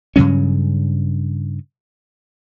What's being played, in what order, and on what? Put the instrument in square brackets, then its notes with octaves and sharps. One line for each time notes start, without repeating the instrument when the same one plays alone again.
[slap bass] G2 C#3 F#3 C#4